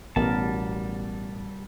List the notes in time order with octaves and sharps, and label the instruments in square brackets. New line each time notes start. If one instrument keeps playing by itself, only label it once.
[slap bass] A1 [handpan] B2 B3 A#4 [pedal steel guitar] G3 A5